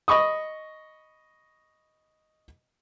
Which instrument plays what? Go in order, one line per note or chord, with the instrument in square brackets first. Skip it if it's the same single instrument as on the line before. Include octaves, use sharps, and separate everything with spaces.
[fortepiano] D#5 B5 C#6 D#6